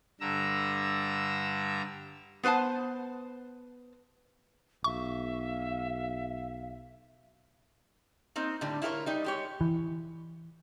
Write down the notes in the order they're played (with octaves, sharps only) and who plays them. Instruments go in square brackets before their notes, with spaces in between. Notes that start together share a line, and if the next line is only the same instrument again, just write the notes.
[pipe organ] G2 D3 A#5 E6
[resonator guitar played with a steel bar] B3 B4 C5 F#5 A5
[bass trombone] B1 [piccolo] E5 [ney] F5 [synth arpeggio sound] C#6
[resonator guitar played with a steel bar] A#3 C4 D#4
A2 D3 G3
E4 F4 G4 A#4 C#5
G3 D#4
G#3 G4 C#5
[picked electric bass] E3